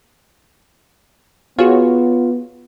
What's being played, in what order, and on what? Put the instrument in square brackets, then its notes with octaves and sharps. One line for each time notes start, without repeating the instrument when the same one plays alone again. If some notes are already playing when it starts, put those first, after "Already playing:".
[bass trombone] B3 [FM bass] F4 [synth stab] F#4 G#4 C#5